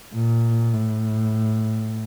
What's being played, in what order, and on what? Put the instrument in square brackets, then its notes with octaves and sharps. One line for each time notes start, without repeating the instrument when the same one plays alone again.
[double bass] A#2
A2